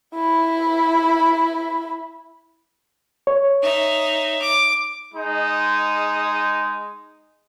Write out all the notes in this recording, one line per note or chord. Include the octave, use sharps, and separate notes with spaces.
E4 B5
C#5
D#4 E5
D6
G#3 D#4